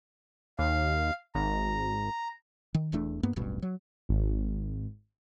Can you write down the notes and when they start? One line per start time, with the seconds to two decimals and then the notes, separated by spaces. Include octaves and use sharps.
0.59 D#2 F5
1.35 G#1 A#5
2.75 D#3
2.92 E1 E2 A3 D4
3.23 G2 A#3 B3
3.36 D1 A1 G2 B2
3.62 F#3
4.09 G#1